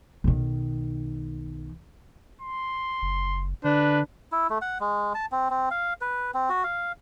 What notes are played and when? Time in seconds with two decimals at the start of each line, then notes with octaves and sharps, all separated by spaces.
0.24 B1 D#3
2.41 C6
3.02 F#1
3.64 D3 D4 B4
4.32 E4
4.50 A3
4.62 F#5
4.80 G#3
5.15 A5
5.32 C4
5.50 C4
5.71 F5
6.01 B4
6.34 C4
6.50 F#4
6.64 F5